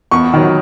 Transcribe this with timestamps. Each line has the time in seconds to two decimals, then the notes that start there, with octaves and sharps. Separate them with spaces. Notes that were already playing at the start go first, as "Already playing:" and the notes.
0.11 E2 C#6
0.34 D#3 F#3